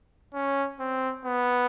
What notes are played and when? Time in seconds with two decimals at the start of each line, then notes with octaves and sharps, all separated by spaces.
0.34 C#4
0.80 C4
1.25 B3